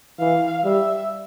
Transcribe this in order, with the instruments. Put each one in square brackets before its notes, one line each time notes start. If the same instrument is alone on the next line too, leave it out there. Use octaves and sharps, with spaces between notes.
[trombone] E3 [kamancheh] F5
[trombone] G3 [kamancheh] E5